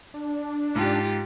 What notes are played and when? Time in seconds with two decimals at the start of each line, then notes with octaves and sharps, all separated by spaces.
0.14 D4
0.76 G#2 F4 G4